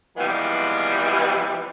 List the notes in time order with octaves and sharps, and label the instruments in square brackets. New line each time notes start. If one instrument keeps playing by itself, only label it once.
[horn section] C3 E3 F3 G3 G#3 B3